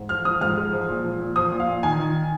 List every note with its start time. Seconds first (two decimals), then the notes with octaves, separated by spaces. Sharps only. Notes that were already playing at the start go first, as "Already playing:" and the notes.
Already playing: G#2
0.09 F3 F6
0.25 F3 D#6
0.41 G#2 F6
0.57 G#3
0.73 F3
0.89 A#2
1.04 F3
1.20 A#2
1.36 F3 D#6
1.52 A#2
1.60 F5
1.68 A#2
1.83 D#3 G#5
1.99 D#3